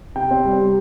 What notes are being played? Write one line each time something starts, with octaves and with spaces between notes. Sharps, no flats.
C3 G5
C4
G3
C3